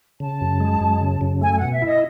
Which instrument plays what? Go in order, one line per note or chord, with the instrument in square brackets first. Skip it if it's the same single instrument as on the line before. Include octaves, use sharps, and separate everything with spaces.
[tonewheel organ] C#3 [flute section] A5
[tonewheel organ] F#2
G#3
F#2
C#3
F#2
[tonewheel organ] A3 [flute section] G#5
[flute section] G#5
[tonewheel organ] B2 [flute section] F#5
[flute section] E5
[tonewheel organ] E4 [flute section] D#5